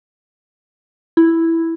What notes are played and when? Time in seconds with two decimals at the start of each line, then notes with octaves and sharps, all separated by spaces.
1.17 E4